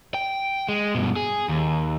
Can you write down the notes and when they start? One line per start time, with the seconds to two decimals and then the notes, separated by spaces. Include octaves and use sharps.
0.14 G5
0.69 G#3
0.95 G2 B2
1.16 G#4
1.49 D#2